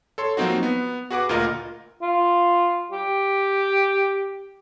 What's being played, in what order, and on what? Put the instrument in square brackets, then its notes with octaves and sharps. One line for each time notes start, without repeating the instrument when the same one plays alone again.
[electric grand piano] A4 C#5 C6
F3 F#3 A#3 C4 D#4 F#4
B3
F#4 G#4 B4 F#5 D6
D2 A#2 F4 A#4 D#5
[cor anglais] F4
G4